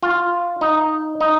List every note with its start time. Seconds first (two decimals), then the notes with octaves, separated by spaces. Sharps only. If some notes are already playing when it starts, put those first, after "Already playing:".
0.03 F4
0.61 D#4
1.21 D#4